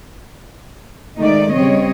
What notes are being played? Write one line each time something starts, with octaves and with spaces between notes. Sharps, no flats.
D#3 G#3 A3 D#4 D5
C#3 G3 C4 C#5 D#5